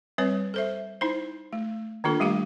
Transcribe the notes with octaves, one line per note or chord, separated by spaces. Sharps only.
G3 C4 B4 C#5
A4 C5 E5
D#4 E4 C5
A3
D#3 A#3 D4 F4 A4
G3 A3 G4 F5